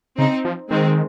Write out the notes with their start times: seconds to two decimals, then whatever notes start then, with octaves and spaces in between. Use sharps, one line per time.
0.18 C#3 C4 D#4
0.45 F3
0.70 D#3 G#3 C4